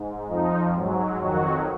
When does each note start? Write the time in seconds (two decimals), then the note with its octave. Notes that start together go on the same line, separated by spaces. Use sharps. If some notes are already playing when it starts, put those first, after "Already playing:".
Already playing: G#2
0.28 F2 F3 D#4
0.74 G#2 F#3
1.20 F2 D#3 F#3 F#4